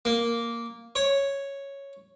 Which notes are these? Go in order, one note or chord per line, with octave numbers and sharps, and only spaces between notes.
A#3
C#5